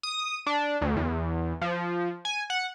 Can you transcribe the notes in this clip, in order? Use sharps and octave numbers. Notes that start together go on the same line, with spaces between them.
D#6
D4
D2
E2
F3
G#5
F#5